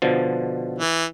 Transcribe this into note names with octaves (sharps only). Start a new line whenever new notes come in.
B2 D3 F3
E3